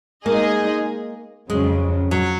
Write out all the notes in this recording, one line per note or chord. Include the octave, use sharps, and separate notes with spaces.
G#3 A#3 D#4 G#4 D#5
F2 C#3 F#3 G#3
F#3